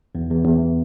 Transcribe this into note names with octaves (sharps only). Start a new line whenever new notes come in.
E2
E2
E2